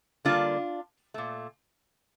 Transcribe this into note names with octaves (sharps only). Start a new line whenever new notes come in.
D3 G3 A#3 D4 F4
A#2 A3